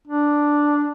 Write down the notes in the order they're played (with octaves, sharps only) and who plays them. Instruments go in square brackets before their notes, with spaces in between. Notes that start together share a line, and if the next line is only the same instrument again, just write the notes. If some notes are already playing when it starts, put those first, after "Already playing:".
[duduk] D4